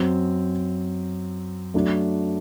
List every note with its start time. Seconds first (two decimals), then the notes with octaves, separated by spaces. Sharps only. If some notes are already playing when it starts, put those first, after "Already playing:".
Already playing: F#2 F#3 C4
1.74 F#2 F#3 A3 D4